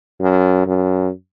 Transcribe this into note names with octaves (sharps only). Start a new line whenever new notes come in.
F#2
F#2